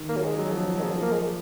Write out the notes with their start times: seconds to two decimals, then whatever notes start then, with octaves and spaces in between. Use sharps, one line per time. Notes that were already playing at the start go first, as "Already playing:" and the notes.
Already playing: D#3
0.09 A#3
0.16 F#3
0.24 G#3
0.38 F#3
0.49 F3
0.60 F#3
0.77 D#3 F#3
0.83 C#3 F3
1.02 A#3
1.13 G#3